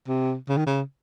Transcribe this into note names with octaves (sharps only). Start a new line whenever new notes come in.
C3
C#3
D#3
C#3